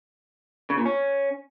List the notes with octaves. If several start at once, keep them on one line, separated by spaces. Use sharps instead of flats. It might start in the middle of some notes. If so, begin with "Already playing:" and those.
C#3
A#2
C#4